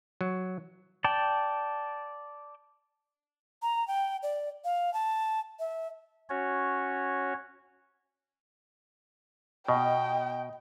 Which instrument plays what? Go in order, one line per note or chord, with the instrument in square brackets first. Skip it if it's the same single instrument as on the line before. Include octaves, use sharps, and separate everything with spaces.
[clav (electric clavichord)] F#3
[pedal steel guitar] D5 G5 A5
[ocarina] A#5
G5
D5
F5
A5
E5
[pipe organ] C#4 F#4 C#5
[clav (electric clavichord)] B2 [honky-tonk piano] D#5 [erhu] G5